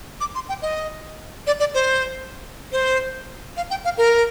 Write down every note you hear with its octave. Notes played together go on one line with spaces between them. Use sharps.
D6
C6
G5
D#5
D5
D5
C5
C5
F5
G5
F5
A#4